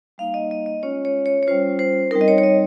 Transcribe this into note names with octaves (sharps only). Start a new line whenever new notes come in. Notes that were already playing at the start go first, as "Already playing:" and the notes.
G3 A#3 D#4 F5
D#5
D#5
D#5
G#3 C#4 F4 C#5
C#5
C#5
C#5
G3 C#4 F4 C5
C5
G3 C4 D#4 A#4
D#5
C#5
C#5
D#5